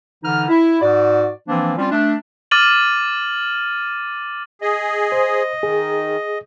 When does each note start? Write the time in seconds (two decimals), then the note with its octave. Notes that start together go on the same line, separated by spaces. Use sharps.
0.23 D3 E3 D#4 F6
0.48 E4
0.82 G#2 F#4 D5
1.48 E3 F3 A#3 C4 D4
1.78 G3 C4 C#4 F4
1.91 A3 D4
2.51 D6 F6 A6 D#7 F#7
4.62 G#4 D#5
5.12 C5
5.63 D#3 G#4